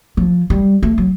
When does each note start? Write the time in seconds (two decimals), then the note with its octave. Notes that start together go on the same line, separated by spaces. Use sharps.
0.17 F3
0.50 G3
0.83 A3
0.98 F#3